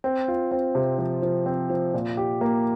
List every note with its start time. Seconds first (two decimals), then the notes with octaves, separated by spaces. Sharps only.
0.04 C4
0.28 F4
0.51 C4
0.75 C3
0.98 F3
1.22 F3
1.46 C4
1.70 F3
1.94 A#2
2.17 G4
2.41 A#3